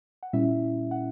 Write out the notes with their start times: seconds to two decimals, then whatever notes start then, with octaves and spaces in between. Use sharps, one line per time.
0.23 F#5
0.33 A#2 G3 C#4 E4 E5
0.91 F#5